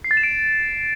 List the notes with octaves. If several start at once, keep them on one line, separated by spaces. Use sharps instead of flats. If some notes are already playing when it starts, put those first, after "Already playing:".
C7
A6
E7
D7